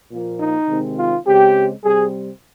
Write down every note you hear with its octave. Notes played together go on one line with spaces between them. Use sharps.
A#2 F3 A#3
D#4
C3 D#3 G#3 C4
F4
C#3 G#3 C4 G4
C3 G3 C4 G#4